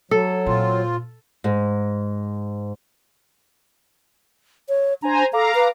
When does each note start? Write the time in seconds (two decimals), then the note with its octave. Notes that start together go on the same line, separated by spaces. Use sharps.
0.11 F#3 A4
0.46 A#2 C4 F4
1.44 G#2
4.69 C#5
5.02 D4 C5 G#5 A#5
5.33 A4 F5 A#5 D6
5.55 B4